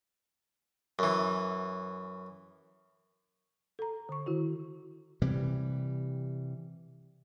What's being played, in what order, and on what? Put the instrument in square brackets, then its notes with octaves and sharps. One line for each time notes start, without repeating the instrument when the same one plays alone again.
[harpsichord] F#2 E3
[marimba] A4 A#5
D3 C#6
D#3 E4 F#4
[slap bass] C3 E3 G3